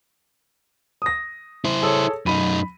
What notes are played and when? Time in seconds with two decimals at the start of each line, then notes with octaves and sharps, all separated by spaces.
1.02 D#6 A#6
1.65 E4 C5
1.82 G#4 A4 C#5
2.26 F#2 D#4 B5 D#7